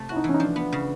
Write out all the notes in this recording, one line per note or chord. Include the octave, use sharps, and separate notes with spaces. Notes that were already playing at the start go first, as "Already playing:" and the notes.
Already playing: C3 A3
E4 F#4
D#4
E3 C#4
D#4
F3 D4
B3
C#3